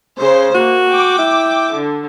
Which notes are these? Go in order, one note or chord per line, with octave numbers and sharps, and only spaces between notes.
C#3 C5
A#3 F#4
G5 D6
E4
D3